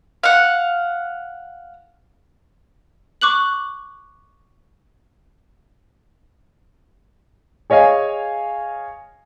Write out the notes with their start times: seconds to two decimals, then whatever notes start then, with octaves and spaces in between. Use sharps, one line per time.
0.23 F5 F#5
3.21 C#6 D6 F#6 F#7
7.70 G#4 C#5 D#5 F5 G#5